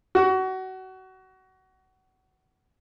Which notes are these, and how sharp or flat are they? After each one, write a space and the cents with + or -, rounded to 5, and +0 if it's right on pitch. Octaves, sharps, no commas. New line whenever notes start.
F#4 +25